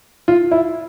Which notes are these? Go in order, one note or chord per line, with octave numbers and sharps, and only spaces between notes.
F4
E4